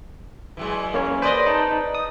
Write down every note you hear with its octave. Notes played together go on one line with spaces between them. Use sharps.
E3 F#3 G#3
A#3 C#4 C#5
B4 C5 D5 D#5
D#4 A5
D#6